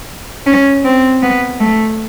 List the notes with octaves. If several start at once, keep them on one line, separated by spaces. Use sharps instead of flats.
C#4
C4
B3
A3